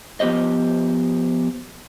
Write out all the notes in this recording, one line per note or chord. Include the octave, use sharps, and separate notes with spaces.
F3 B3 G4 C5 D#5